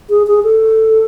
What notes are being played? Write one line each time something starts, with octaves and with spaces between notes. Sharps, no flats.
G#4
G#4
A4